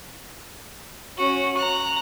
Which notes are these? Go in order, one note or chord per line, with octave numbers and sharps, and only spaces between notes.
C#4 F#4
A#5 F#6